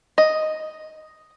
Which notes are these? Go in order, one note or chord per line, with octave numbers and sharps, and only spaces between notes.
D#5